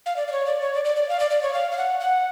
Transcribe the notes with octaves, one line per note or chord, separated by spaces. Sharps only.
F5
D5
D5
C#5
D5
C#5
D5
D5
D5
F5
D5
D5
C#5
F5
F5
F#5
F#5